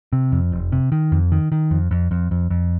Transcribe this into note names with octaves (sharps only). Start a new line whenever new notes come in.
C3
F2
F1
C3
D#3
F2
D#3
D#3
F2
F2
F2
F2
F2